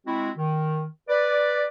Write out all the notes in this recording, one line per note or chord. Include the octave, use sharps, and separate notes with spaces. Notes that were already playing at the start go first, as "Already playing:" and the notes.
G#3 C4 E4 F#4
D#3
B4 D5